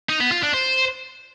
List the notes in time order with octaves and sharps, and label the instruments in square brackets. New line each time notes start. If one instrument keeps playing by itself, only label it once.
[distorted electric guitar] D#4
B3
F4
D4
C5